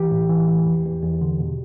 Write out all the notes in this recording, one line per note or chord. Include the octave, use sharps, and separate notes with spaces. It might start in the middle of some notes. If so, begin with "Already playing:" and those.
Already playing: E3 G4
A2
E3
E3
E2
E2
E2
D3
B2